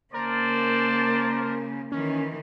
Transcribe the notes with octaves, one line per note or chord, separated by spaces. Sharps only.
C#3 A#3 A#4 C5 D5 A5
D#3 E3 C#4